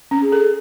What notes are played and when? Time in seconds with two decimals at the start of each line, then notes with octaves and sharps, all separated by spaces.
0.11 C#4
0.22 G#4
0.32 A4